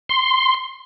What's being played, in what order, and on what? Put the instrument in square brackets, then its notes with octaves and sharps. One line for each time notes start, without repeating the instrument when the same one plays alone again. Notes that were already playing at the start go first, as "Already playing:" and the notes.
[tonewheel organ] C6